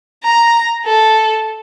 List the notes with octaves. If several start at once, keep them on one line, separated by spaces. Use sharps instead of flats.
A#5
A4